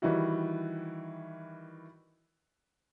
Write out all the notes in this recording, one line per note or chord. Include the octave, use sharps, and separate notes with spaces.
D#3 E3 G3 E4 F#4